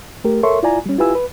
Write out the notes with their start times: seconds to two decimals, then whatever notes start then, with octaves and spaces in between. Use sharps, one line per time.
0.24 A3 G4 A#4
0.43 A4 A#4 C#5 E5 C6 C#6
0.63 E4 F4 D5 G#5 A#5
0.86 G3 C#4
0.98 E4 F4 G4 B4 G#5 E6
1.15 B4